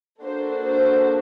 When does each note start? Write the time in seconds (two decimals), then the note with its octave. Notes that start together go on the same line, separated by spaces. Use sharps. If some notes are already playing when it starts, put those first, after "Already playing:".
0.22 A#3 D4 F#4 A4 C5
0.64 C5